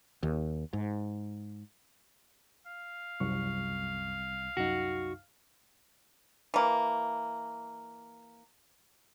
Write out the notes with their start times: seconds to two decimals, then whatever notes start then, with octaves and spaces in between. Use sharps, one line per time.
0.23 D#2
0.73 G#2
2.66 F5
3.20 C2 F#2 C#6
4.57 C2 F#2 D#4 F#4
6.54 E3 A#3